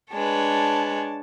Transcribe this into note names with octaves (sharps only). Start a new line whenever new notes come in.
G#3 D4 B4 C#5 A5